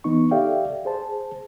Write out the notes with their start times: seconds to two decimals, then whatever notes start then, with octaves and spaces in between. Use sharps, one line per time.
0.04 E3 B3 D#4 C#6
0.31 G4 A4 D5 E5 F5 G5
0.85 G#4 C5 A5